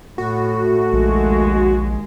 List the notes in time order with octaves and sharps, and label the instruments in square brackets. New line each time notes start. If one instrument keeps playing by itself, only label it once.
[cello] A2 [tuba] A3 [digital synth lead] F#4
[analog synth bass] A#1 [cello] D#2 G#3